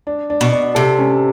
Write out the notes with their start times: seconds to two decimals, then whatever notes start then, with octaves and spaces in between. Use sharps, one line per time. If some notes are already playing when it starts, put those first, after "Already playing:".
0.07 D4
0.30 D4
0.41 B2
0.52 D4
0.75 C3 A4
0.99 C#4